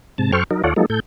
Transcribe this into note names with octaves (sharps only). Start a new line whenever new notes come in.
G#2 C3 A5
F#2 A4 C5 G5 C#6 F6
F#3 D#4 A#4
D#2 F4 A4 C#5 D5 F#5
F3 F#3 G#3 A#3 D#4 A4
A2 A4 G6